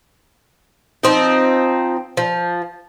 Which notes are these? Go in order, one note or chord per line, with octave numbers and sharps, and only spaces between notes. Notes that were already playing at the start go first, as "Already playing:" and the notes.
F3 C4 D#4
F3